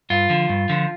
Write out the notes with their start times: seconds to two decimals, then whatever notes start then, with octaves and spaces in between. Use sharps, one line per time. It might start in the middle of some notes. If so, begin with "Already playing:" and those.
0.10 G2 F4
0.30 D3 F3
0.49 G2
0.69 D3 F3